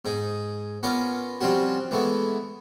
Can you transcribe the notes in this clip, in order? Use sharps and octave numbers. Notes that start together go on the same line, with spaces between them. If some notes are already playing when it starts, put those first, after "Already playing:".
G#2 D#4 G#4
B3 C#4 F4 A#4 D5
F3 G3 C4 C#4 F#4
E3 G#3 A3 B3